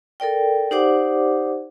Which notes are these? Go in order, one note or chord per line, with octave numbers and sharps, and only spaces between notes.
A4 A#4 D5 G5
D#4 G4 C5 D5 F#5 D6